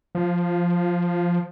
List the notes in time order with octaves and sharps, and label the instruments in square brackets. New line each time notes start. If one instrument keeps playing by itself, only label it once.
[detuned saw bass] F3